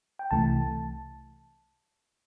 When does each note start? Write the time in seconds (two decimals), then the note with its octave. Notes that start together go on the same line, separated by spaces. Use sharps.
0.19 G5
0.31 C2 C3 E3 A3 A5